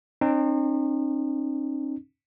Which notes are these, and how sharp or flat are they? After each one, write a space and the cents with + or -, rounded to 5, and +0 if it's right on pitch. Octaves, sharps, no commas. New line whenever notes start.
C4 +45 D#4 -40